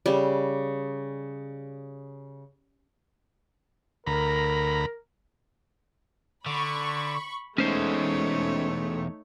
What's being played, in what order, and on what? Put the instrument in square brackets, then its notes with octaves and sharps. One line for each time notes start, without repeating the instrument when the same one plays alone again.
[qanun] C#3 G3
[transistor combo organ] D2 A#5 B5 [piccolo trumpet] A#4
[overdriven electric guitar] D3 [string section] B5 C#6
[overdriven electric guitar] E2 G#3 [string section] A3 [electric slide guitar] C#4 C5 [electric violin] D#4 C#5